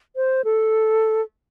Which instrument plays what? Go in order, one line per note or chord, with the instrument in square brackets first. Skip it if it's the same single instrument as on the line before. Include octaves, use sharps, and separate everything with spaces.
[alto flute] C5
A4